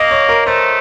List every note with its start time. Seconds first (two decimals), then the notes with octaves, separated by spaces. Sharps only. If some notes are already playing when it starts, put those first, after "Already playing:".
Already playing: A#3 D#5
0.11 C#5
0.29 A#4
0.46 A3 C5